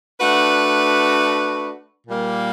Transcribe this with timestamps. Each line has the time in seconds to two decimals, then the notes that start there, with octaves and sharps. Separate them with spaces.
0.21 A3 D4 F#4 B4
2.07 A#2 G3 A#3